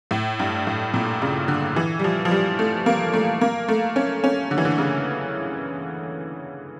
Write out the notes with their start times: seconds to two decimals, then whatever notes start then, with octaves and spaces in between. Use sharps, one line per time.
0.11 A2
0.39 G2
0.67 A2
0.94 A#2
1.22 C#3
1.48 D3
1.76 E3
1.99 G3
2.04 F3
2.25 F3
2.31 G3
2.59 A3
2.86 A#3
3.13 A3
3.41 A#3
3.68 A3
3.96 C#4
4.24 C#4
4.51 D3
4.58 E3
4.65 D3
4.78 C#3